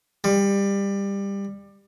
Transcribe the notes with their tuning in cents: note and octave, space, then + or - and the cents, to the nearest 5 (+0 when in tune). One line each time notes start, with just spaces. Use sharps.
G3 +20